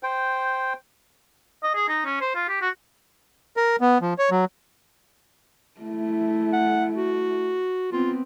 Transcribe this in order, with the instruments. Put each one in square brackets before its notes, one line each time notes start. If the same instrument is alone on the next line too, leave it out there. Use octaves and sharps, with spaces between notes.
[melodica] C5 G5
[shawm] D#5
G#4
D#4
C#4
C5
F4
G4
F#4
[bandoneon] A#4
B3
F3
C#5
F#3
[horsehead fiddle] A3 E4
[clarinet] F#5
F#4
[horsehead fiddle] B3 C4 [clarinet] F4